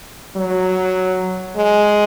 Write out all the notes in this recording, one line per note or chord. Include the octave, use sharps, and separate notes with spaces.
F#3
G#3